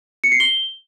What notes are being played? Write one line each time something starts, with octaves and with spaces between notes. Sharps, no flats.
C#7
C7
G7